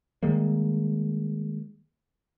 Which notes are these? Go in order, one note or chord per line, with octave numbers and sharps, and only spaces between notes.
D#3 G3 G#3 A#3